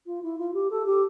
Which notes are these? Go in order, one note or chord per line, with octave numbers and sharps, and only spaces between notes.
F4
E4
F4
G4
A4
G4